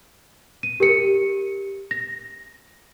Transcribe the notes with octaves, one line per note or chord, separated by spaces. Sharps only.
D#7
G4 A#4 C#7
A#6